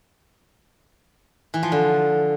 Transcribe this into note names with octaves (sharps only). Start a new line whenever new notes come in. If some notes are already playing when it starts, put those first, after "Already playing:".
E3
F3
D3